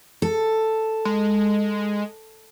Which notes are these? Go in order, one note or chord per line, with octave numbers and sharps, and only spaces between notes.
A4
G#3